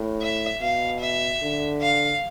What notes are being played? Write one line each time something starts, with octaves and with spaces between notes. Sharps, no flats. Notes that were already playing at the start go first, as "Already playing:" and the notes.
Already playing: A2
E5
B2 F5
E5
D3
F5